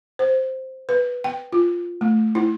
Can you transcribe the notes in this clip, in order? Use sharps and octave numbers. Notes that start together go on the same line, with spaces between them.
C5
B4
G5
F4
A3
E4